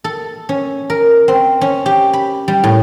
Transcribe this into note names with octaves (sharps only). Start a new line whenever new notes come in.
A4
C#4
A#4
C4
C#4
G4
B5
G3
A2